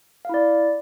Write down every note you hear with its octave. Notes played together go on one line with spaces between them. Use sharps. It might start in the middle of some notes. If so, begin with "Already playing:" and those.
E4 D5 F5